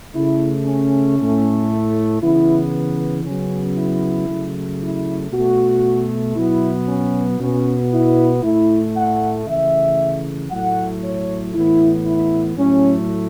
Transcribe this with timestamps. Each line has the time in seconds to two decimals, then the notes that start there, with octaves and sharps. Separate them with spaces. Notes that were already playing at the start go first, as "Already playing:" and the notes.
0.14 C#3 A3 E4
0.66 C#4
1.17 A2 A3
2.21 C#3 E3 B3 E4
3.25 C#3 F#3 B3 C#4
3.76 E4
4.28 C#3 F#3 A3
4.81 E4
5.32 B2 A3 F#4
6.36 B2 F#3 B3 E4
6.88 C#4
7.39 B2 B3 C#4
7.92 E4
8.43 A2 A3 E4
8.96 F#5
9.47 C#3 E3 A3 E5
10.51 A2 F#3 A3 F#5
11.03 C#5
11.54 A2 E3 B3 E4
12.07 E4
12.57 A2 F#3 A3 C#4